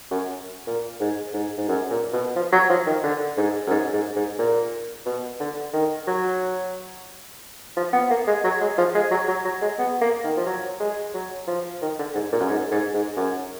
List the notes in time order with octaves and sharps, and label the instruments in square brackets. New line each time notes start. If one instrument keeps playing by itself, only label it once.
[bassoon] F#2
A#2
G#2
G#2
G#2
F#2
A#2
B2
F3
F#3
F3
D#3
D3
G#2
F#2
G#2
G#2
G#2
A#2
B2
D3
D#3
F#3
F3
B3
A#3
G#3
F#3
G#3
F3
G#3
F#3
F#3
F#3
G#3
B3
A#3
D#3
F3
F#3
G#3
F#3
F3
D#3
D3
G#2
A#2
F#2
G#2
G#2
G#2
F#2